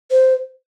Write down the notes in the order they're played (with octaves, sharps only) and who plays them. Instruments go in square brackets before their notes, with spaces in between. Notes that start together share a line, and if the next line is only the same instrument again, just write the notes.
[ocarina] C5